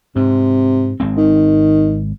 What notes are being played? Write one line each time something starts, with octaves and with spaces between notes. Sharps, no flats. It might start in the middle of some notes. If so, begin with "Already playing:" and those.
G#2 C3
G#1 G#3 C4
D#3